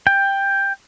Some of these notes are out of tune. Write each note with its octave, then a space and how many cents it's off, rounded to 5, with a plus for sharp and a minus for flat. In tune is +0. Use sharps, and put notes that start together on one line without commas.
G5 +10